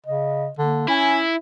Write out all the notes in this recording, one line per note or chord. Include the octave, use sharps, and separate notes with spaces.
C#3 D#5
D3 A#3
C#4 E4 G#5